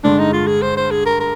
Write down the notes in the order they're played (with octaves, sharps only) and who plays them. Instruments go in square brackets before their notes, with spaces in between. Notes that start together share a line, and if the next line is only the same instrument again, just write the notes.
[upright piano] G2 D3 G#3 [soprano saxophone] D4
[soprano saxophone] D#4
F4
G#4
C5
C5
G#4
A#4
A#4